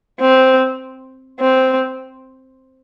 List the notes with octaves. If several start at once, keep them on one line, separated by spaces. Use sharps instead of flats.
C4
C4